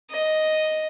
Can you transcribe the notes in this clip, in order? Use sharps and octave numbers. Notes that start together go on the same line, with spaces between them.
D#5